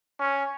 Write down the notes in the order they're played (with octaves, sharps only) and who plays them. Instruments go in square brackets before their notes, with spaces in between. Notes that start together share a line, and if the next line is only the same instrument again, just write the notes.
[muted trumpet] C#4